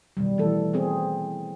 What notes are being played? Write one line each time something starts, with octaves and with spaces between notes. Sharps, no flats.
B2 D#3 G3
E3 A3 A4
B3 C4 G#4